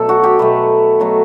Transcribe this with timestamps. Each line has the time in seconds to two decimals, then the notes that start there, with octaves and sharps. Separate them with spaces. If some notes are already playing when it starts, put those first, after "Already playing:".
Already playing: B2 F#3 A3 A4
0.09 F#4
0.24 G4
0.39 B2 F#3 A3 B4
1.00 B2 F#3 A3